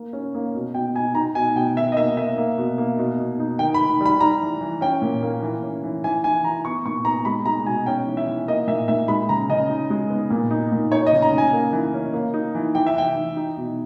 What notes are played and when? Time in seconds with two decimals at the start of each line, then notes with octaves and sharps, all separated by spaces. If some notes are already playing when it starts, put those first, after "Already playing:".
Already playing: A#3
0.13 C#4
0.35 A#3
0.55 B2
0.74 B2 G5
0.95 D#4 G#5
1.15 D#4 A#5
1.35 B2 G#5
1.56 B2 G5
1.76 D#3 E5
1.92 D#5
1.96 A#3 E5
2.17 A#3 E5
2.38 A#3
2.58 B2
2.78 A#3
2.99 B2
3.19 B2
3.40 D#4
3.59 D#3 G5
3.74 B5
3.80 D#3
4.01 G3 B5
4.20 G3 A#5
4.41 E3
4.61 E3
4.81 C#4 G5
5.02 A#2
5.23 A#3
5.42 E3
5.62 C#4
5.83 E3
6.04 E3 G#5
6.24 E3 G#5
6.44 E3 A#5
6.65 B3 C#6
6.86 A#2 C#6
7.05 B3 A#5
7.25 G#3 B5
7.46 G#3 A#5
7.66 B2 G#5
7.86 C#4 G5
8.07 E3
8.17 E5
8.27 E3
8.48 A#3 D#5
8.67 A#2 E5
8.88 A#2 E5
9.08 G#3 B5
9.29 C#3 A#5
9.49 C#3 D#5
9.69 D#4
9.90 G#3
10.10 B3
10.30 A#2
10.51 D#4
10.72 A#2
10.91 D#4 C#5
11.07 D#5
11.13 C#3
11.22 A#5
11.32 C#3
11.38 G#5
11.53 A#3
11.73 E3
11.94 C#4
12.14 A#3
12.34 D#4
12.55 E3
12.75 E3 G5
12.86 E5
12.96 E3 G5
13.16 E3
13.37 D#4
13.57 B2